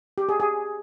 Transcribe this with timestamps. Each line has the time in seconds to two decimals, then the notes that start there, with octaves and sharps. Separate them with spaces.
0.18 G4
0.29 G#4
0.40 G#4